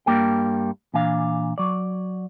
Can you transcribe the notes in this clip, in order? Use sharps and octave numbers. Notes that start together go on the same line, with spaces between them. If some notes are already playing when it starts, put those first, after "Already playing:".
G2 G3 A#3 A#4 G5
A#2 E3 D4 F5
F#3 D5